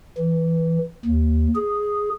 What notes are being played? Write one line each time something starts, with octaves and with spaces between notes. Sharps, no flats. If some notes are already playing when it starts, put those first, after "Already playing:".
E3
D#2
G#4